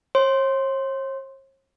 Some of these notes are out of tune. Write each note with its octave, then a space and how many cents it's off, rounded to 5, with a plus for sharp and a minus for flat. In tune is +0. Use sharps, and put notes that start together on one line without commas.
C#5 -45 C6 +0